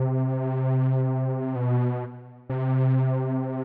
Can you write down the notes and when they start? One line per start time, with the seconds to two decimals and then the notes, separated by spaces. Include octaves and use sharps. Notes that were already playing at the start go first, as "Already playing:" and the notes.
Already playing: C3
1.56 B2
2.50 C3